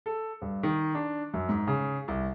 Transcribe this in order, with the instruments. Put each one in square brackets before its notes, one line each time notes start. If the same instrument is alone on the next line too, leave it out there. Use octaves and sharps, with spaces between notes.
[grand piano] A4
G2
D#3
D4
F#2
G#2
C#3
C2